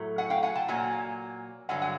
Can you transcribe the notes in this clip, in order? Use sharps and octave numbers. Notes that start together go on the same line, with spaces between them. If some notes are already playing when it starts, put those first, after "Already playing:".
Already playing: A2 F#3 A3
F#5 G#5
F5 G5
F#5 G#5
G5 A5
A#2 F#3 A#3 F#5 G#5
G2 D3 F#3 F#5 G#5
F#5 G#5